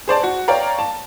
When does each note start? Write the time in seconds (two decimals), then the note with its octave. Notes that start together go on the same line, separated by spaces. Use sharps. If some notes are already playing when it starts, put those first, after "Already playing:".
0.08 G#4 C5 D5 A5
0.23 F#4
0.48 C#5 D5 F5 G5 A#5
0.79 A5